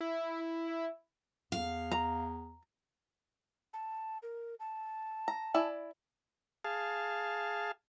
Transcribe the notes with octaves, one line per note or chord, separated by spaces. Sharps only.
E4
E2 F5
A#5
A5
A#4
A5
A#5
E4 D5 G#5
G#4 F5 A5